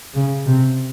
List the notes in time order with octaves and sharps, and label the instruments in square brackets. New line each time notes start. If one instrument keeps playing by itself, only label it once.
[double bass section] C#3
C3